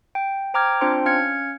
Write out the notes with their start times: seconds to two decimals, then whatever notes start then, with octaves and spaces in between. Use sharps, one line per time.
0.15 G5
0.54 C5 G5 A#5 D6 F6 G#6
0.81 C4 D4 F4 C5 G5 C6
1.06 C#4 F5 F6 G#6 C#7